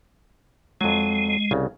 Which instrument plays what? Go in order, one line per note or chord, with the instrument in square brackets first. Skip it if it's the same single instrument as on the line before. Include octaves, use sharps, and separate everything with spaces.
[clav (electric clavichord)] F2 F#3 [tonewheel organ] G#3
[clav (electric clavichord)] C2 C#3